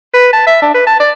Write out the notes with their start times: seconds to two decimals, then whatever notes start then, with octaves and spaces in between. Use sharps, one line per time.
0.14 B4
0.33 A5
0.47 E5
0.62 D4
0.74 B4
0.87 A5
1.00 D5